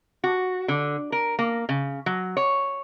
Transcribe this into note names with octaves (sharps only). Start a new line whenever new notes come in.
F#4
D3
A#4
A#3
C#3
F#3
C#5